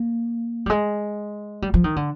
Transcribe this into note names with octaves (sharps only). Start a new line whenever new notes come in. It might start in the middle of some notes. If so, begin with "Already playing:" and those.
Already playing: A#3
G3
G#3
G3
F3
D#3
D3